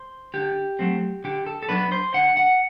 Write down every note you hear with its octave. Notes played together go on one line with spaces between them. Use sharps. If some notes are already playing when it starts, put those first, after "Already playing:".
Already playing: C5
D3 G4
F#3 A3 C4
D3 G4
A4
A4
F#3 B3 D4 B4
C5
D3 F#5
F#5